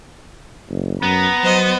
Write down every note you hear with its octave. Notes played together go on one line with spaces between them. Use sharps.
F#1
F#2 B3 A#5
F#3 C5 D#5